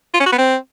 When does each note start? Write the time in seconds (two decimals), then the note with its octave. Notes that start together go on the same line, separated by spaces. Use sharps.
0.14 F4
0.20 C#4
0.26 F#4
0.32 B3
0.38 C4